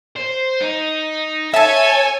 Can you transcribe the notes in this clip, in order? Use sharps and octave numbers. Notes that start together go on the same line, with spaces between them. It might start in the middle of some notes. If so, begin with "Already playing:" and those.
C5
D#4
A4 C#5 E5 G#5 A5